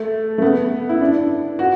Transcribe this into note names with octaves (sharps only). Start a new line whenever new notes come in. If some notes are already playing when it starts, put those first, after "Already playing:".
Already playing: A3
A3
B3
E4
D4
F#4